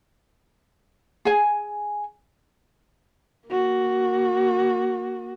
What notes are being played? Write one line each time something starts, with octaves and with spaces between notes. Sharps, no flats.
G#4 G#5
A#3 F#4